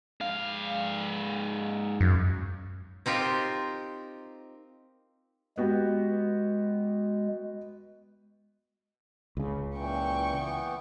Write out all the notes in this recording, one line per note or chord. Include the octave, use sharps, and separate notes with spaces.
G#2 F5
F#2
C4 D#4 F4 G4 A#4
G#3 B3 F#4 G4
C#2 C#3
A#2 E3 G5 C#6
E3 B3